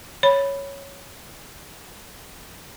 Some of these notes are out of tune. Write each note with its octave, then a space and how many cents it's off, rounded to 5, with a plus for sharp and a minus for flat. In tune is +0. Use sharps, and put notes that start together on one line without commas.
C#5 +0 B5 +0